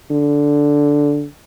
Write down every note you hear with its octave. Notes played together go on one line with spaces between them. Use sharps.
D3